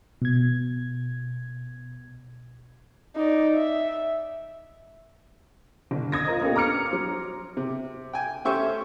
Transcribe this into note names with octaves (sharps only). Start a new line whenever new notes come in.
B2 G#6
D#4 D5
E5
G1
D#6 G#6 A#6
F4 A#4 C5 D#5
A#3 B3 C#4 D4 G4 A4
A#5 D6 F6 C#7
F#3 C5
C3
G5 G#5
A3 C#4 G4 C5 E5 C#6